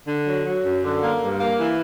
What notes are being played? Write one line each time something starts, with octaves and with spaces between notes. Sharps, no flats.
D3
F#3
F#3
F#2
D3
A#3
G2
A#3
E3